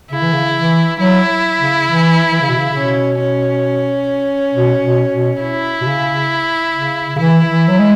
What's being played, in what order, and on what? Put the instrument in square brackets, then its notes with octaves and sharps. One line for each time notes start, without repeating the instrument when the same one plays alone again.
[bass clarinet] C#3 [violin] E4
[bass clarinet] E3
C#3
E3
[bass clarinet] F#3 [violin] E4
[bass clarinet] C#3
E3
E3
C#3
B2
C#3
[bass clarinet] B2 [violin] C#4
[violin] C#4
[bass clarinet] B2
B2
B2
[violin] E4
[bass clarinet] B2
C#3
C#3
C#3
[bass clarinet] E3 [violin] E4
[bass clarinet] E3
F#3
G#3